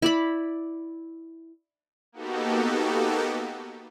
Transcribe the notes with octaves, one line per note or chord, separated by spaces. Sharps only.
E4 D5 B5
A#3 B3 D#4 F#4 G4 A4